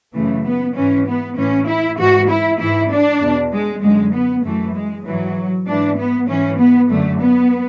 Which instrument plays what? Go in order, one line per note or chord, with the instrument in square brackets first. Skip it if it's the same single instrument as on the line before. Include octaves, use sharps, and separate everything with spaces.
[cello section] F#2 C#3 E3 A3
B3
G#2 E3 C#4
B3
A2 E3 C#4
E4
G#2 E3 F#4
E4
G#2 E3 E4
D4
E2 B2
G#3
F#2 D3 G#3
B3
F#2 E3 A3
G#3
G#2 E3 F#3
G#2 E3 D4
B3
G#2 E3 C#4
B3
F#2 D3 A3
B3